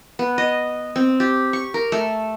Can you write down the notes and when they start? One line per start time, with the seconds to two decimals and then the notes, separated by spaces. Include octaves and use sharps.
0.19 B3
0.38 D#5
0.96 C4
1.20 G4
1.53 C#6
1.74 A#4
1.92 A3